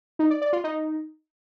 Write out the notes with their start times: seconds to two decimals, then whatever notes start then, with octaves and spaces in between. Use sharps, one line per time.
0.19 D#4
0.30 D5
0.42 D5
0.53 F4
0.64 D#4